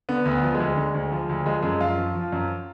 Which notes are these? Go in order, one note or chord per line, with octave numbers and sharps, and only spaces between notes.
D3 B3
D2
B3
F3
G#3
D2
D3
D2
F3
D2
F3 G#3
F#2 G#3
F#2 F4
F3
F3
F#2